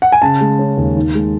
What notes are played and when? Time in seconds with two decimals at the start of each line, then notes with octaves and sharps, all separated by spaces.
0.02 F#5
0.12 G#5
0.22 C#3 A5
0.41 G#3
0.59 C#4
0.77 D#2
0.96 D#3
1.15 G#3